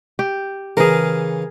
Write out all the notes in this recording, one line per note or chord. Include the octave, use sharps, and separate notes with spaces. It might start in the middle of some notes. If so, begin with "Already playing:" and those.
G4
C#3 E3 G#4 A#4